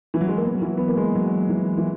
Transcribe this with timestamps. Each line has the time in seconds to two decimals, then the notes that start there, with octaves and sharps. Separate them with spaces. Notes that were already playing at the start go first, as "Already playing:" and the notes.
0.14 E3
0.21 F#3
0.29 G#3
0.37 A#3
0.45 B3
0.54 F#3
0.62 E3
0.77 B3
0.88 A#3
0.97 G#3
1.15 F#3
1.49 E3
1.78 E3